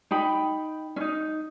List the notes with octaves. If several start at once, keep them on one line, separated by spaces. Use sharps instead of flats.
D#4 G5 B5
C#4 D#4